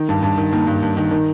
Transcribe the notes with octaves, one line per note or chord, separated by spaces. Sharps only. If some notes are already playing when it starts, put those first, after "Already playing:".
Already playing: D#3
G2
G2
D#3
D#3 A#3
G2
G2
D#3
D#3